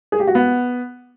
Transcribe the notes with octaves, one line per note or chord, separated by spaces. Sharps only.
G#4
G4
F#4
B3